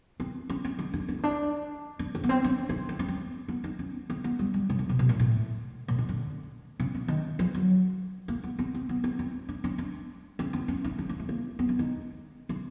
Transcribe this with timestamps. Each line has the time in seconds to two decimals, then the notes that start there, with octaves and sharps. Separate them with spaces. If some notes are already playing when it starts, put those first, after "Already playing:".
0.20 C4
0.49 C#4
0.64 C#4
0.79 D#4
0.93 D4
1.08 C#4
1.19 C#4
1.23 D4
1.99 D4
2.15 C4
2.24 B3
2.29 C4
2.44 D4
2.69 D#4
2.89 D4
2.99 C#4
3.08 C4
3.48 B3
3.64 D#4
3.79 C#4
4.10 C4
4.24 B3
4.39 G3
4.54 G3
4.69 C#3
4.79 D3
4.89 C3
4.99 B2
5.09 A#2
5.20 A2
5.88 A#2
5.98 D#3
6.09 D3
6.80 C#3
6.95 D3
7.08 D#3
7.39 F3
7.54 F#3
8.28 A#3
8.43 B3
8.59 C4
8.74 C4
8.89 B3
9.04 C4
9.19 C4
9.49 D4
9.64 D4
9.78 D4
10.39 C#4
10.53 C4
10.68 C#4
10.84 D#4
10.98 D4
11.09 A#3
11.19 A3
11.29 A#3
11.59 B3
11.69 D4
11.79 D#4
12.49 D4